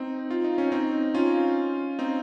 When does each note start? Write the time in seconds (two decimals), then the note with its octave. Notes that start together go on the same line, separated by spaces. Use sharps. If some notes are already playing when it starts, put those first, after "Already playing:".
Already playing: C4 D#4
0.31 F4
0.44 D#4
0.58 C#4
0.72 C4 D#4
1.14 C#4 F4
1.99 C4 D#4